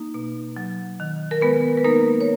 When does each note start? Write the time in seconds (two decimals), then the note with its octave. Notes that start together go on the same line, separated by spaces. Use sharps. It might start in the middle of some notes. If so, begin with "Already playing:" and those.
Already playing: A#3 D#4
0.14 B2
0.57 F#3
1.00 D#3
1.31 A#4
1.41 G#3 B3 B4
1.77 B4
1.84 A#3 D#4 A#4
2.21 C#5